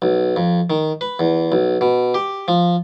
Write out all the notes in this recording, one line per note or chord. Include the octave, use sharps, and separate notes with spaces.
B1
F2
D#3
B4
E2
B1
B2
G4
F3